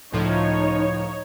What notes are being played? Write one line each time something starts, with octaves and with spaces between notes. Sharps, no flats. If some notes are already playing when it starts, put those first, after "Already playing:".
C#2 A2 F3 D#4 C#5